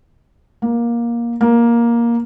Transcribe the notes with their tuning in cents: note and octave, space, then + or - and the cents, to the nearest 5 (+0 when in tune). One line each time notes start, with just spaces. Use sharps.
A#3 +15
A#3 +10